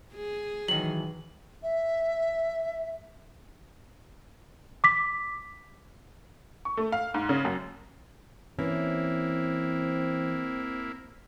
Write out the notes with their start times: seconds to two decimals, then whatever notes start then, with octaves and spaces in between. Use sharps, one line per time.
0.14 G#4
0.68 D#3 E3 F#3 F#7
1.63 E5
4.84 D6 B6
6.65 C#6
6.77 A3
6.92 F5
7.14 G#2
7.29 C#3
7.45 F#2
8.59 E3 A#3 C4 C#4 E4